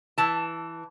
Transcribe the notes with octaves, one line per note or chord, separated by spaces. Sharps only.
E3 A5